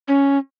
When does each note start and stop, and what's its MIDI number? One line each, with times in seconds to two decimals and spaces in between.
0.08 0.38 61